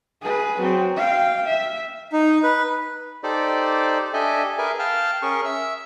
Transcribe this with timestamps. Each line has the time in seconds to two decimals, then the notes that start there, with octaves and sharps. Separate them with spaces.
0.21 G#4 B4
0.58 F#3 C4
0.96 F5 G5
1.46 E5
2.13 D#4
2.43 B4
3.23 D#4 G4 A4 C5 D5
4.14 D4 G4 A4 D#5 E5 G#5
4.58 G#4 A#4 B4 E5 G#5
4.79 F5 G5 A5 F6
5.22 C#4 G#4 A#4 C#6
5.45 E5 E6